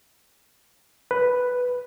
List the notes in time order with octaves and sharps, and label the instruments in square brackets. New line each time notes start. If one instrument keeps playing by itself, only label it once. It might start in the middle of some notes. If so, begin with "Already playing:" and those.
[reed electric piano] B4